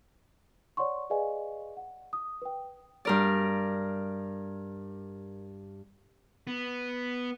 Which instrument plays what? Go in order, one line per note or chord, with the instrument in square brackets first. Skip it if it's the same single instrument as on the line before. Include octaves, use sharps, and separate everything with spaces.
[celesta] C#5 D5 F#5 C6 C#6
G#4 B4 D5 D#5 F5 G#5
F#5
D#6
B4 G5
[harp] G2 A#4 D5
[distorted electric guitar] B3